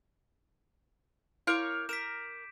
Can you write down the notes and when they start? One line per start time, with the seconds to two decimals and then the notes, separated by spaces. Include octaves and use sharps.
1.47 E4 A#4 C#5 F5 D6 G6
1.89 A#4 B6 D7 E7